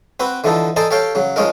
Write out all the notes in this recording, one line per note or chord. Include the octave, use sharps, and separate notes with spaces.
C4 F#4 B4
D3 E3 F3 D#4 A4
A4 C5 D5 D#5 G#5 A#5
G4 A4 C#5 F5 G5
C#3 F#3
F3 G#3 C#4 D#4 A#4